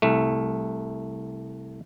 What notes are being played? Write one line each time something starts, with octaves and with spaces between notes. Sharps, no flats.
C2 A3